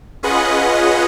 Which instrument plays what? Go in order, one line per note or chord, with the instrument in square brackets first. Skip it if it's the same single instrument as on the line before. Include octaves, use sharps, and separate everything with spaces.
[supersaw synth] C#4 F4 G#4 B4 D#5 F#5